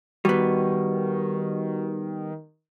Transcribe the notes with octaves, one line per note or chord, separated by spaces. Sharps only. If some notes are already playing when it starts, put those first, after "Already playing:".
D#3 G3 B3 F#4